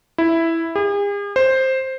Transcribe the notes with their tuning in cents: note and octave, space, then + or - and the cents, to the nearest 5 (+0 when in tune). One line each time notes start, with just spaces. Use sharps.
E4 +0
G#4 -45
C5 +5